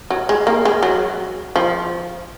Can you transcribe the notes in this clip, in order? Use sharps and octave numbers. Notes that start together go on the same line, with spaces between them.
F#3
G#3
A#3
G#3
F#3
F3